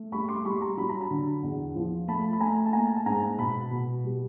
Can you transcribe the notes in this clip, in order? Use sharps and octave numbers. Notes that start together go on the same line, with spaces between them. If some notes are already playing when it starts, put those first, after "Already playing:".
Already playing: A3
G3 B5 C#6
C6 D6
G3 B5 C#6
A#5 C6
F#3 B5
A#5
A5 B5
D3
E2
F3
A3 A5 B5
B5
A3 G#5 A#5
A5
A#3 G#5 A#5
A5
G#2 G#5 A#5
B2 A5 B5
B2
G3